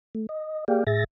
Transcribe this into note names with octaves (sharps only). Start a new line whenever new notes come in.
A3
D#5
A#3 G4 G#4 D5 F5 G5
A2 G#4 E5 A6 A#6